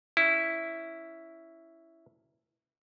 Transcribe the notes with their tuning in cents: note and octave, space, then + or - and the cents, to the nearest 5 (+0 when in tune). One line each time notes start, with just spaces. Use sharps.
C#4 +10 E4 +0